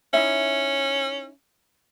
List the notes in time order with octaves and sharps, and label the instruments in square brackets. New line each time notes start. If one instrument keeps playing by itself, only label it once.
[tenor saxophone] C#4 [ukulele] D#4 E4 E5